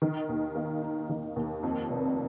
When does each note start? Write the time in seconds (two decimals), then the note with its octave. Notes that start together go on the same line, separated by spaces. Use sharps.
0.02 D#3
0.29 D#2
0.55 A#3
0.82 D#4
1.09 D#3
1.36 D#2
1.63 F2
1.90 F1